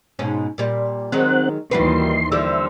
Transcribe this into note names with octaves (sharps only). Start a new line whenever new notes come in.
G#2 B2 C#4
A#2 G3
D#3 F#3 G#3 C4 F#5
D#2 D#3 E3 G3 F#4 B4 C6
D3 F3 G3 E5